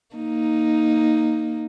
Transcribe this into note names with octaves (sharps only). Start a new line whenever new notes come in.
A#3 D#4